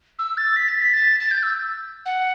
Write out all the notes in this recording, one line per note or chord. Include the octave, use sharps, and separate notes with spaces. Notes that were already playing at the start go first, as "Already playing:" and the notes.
E6
A6
B6
A6
B6
A6
A6
G6
E6
F#5